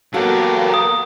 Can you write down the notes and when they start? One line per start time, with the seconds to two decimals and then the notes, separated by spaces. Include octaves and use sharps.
0.14 F#3 A#3 B3 F#4 G4 A4 F5
0.70 A#5 D#6